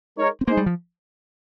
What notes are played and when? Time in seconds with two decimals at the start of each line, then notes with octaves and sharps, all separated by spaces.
0.18 G#3 D#4 A#4 C#5
0.41 C4
0.48 G#3 A#3 D#4 G#4 C5
0.57 G3
0.66 F3